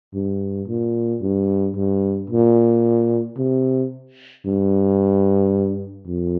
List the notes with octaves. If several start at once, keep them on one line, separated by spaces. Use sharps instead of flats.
G2
A#2
G2
G2
A#2
C3
G2
F2